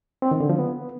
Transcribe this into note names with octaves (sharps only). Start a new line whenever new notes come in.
C4
D#3
D3
F3
B3